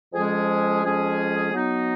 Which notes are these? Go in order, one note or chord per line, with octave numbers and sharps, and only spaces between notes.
F2 F3 G#3 C#4 G#4
F2 F3 G#3 C#4 G#4
F#3 B3 D#4